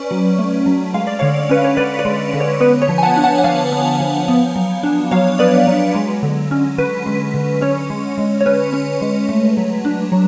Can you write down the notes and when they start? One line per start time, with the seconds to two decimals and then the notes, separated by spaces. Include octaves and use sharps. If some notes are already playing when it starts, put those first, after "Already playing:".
Already playing: C#4 B4 D5
0.11 F#3
0.38 A3
0.66 F#3
0.94 G#3 F5
1.07 D5
1.19 D3 C#5 F5
1.49 C#4 B4
1.64 C#5
1.77 D3 B4 D5
1.99 B4 D5
2.05 G#3
2.34 D3
2.40 C#5
2.60 B3 B4
2.82 C#5
2.89 F3
2.98 G#5
3.03 F#5 A5
3.16 D4
3.24 F#5 A5
3.38 F#5
3.44 F3 F5 G#5
3.72 B3
4.00 F3
4.28 B3
4.56 F#3
4.83 D4
5.11 F#3 C#5 F5
5.39 B3 B4 D5
5.67 F#3
5.95 G#3
6.23 D3
6.51 C#4
6.78 D3 B4
7.06 G#3
7.34 D3
7.61 C#4 C#5
7.90 G#3
8.18 G#3
8.41 C#5
8.46 C#4 B4
8.73 C#4
9.02 G#3
9.29 A3
9.57 F#3
9.85 D4
10.12 F#3